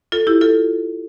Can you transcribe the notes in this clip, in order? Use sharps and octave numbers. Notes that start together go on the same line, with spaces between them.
F4 A4
E4 G4
F4 A4